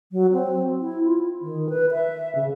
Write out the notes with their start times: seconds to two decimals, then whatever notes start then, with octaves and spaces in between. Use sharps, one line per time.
0.12 F#3
0.33 C4
0.80 E4
1.05 F4
1.42 D#3
1.70 B4
1.92 E5
2.35 C#3